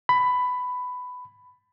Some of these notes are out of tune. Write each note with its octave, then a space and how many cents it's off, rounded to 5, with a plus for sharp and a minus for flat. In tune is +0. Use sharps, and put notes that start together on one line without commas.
B5 +15